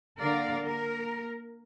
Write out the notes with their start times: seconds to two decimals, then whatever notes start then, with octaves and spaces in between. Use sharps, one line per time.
0.20 D3 A#3 A#4 D5 F5
0.61 A#3 A#4